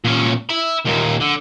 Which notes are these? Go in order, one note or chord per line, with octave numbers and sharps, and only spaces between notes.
A#2 C#4
E5 B5
D#2 A#2
D3